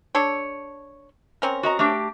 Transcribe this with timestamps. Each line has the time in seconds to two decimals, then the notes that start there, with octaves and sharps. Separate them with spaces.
0.15 D4 A4 C#5
1.42 C4 C#4 A#4
1.63 F#4 D#5 A#5
1.79 A3 D4 G4